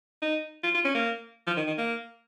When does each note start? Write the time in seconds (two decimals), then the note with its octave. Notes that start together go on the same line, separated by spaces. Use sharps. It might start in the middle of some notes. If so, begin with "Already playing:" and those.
0.22 D#4
0.63 F4
0.74 F4
0.84 C#4
0.94 A#3
1.47 F3
1.57 D#3
1.67 D#3
1.78 A#3